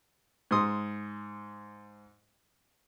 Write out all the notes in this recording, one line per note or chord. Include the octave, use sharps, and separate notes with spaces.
G#2 C6 D#6